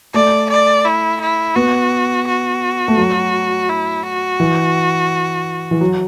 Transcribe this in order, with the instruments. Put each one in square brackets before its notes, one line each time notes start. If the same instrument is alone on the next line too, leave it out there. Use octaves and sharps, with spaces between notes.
[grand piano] A3 [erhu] D5
[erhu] D5
E4
E4
[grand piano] B3 [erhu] F#4
[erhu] F#4
[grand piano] A3
F#3
[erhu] E4
F#4
[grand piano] E3
E3
F#3